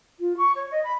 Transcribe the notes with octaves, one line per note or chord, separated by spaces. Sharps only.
F4
C#6
C#5
D#5
B5